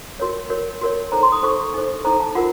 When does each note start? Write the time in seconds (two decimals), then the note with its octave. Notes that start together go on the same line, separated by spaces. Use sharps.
0.20 F#4 A#4 C#5
0.50 F#4 A#4 C#5
0.81 F#4 A#4 C#5
1.12 D#4 A4 C5 A#5
1.23 C6
1.32 D#6
1.43 D#4 A4 C5 C#6
1.74 D#4 A4 C5
2.04 D#4 A4 C5 A#5
2.20 A5
2.35 F4 A#4 F#5